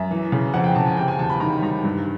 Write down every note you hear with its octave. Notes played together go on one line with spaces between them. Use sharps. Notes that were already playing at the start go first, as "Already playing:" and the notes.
Already playing: F#2 E5
E3
C#3
F2 F#5
G5
C#3 A5
G#5
C3 G5
G#5
E2 A5
B5
D#3 A#5
B5
G3 A#5
G2